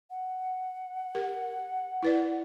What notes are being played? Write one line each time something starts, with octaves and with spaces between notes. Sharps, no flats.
F#5
G4 A#4
E4 B4 D5